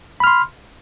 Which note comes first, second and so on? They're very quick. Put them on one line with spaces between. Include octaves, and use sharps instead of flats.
B5 F6 C6